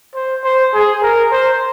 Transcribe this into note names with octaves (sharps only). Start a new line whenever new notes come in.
C5
C5
G#4
A#4
C5